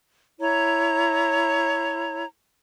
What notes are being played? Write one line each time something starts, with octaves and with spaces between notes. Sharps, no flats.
E4 C#5 A#5